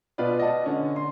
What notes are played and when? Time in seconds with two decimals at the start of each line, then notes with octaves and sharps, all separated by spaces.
0.18 B2 F4 B4 D5
0.38 D5 D#5 F#5 A5
0.66 D3 C#4
0.96 C6